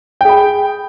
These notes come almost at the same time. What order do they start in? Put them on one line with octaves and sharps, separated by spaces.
G5 G#4 B5